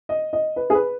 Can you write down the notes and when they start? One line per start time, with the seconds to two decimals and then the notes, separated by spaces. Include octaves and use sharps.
0.09 D#5
0.33 D#5
0.56 B4
0.70 G#4
0.74 B4